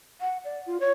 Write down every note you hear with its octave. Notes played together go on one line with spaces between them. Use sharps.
F#5
D5
F4
C#5